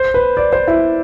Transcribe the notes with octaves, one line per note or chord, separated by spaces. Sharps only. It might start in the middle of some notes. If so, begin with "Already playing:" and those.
Already playing: C5
B4
D5
C5
E4